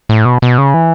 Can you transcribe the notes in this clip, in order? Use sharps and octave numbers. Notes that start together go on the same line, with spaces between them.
A2
B2
B2
C#3
E3